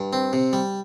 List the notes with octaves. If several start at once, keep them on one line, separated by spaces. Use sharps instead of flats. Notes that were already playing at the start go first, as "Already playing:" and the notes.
Already playing: G2
C4
C3
G3